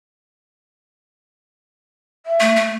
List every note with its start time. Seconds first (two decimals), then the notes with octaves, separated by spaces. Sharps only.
2.26 E5
2.40 A3
2.56 A3